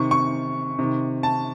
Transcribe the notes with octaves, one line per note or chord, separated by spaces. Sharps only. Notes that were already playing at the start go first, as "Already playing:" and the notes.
Already playing: C3 D#3 C#6
C#6
C3 D#3
A5